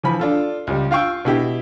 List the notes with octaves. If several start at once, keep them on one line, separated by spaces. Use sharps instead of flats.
E3 F3 B5
D4 F4 A4
C#2 G3
F4 F5 G5 C#6 E6
B2 E4 G4